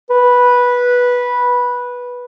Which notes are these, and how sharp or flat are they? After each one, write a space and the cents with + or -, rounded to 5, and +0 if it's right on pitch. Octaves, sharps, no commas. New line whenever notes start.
B4 -10